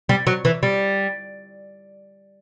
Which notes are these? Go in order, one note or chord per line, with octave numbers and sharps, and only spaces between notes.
G3
F#3
E3
G3